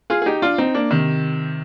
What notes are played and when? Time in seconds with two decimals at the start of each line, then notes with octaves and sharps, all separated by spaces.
0.10 F4 G#4
0.22 G#4
0.26 D#4 G4
0.42 D4 F4
0.58 C4 D#4
0.74 A#3 D4
0.91 C3 D#3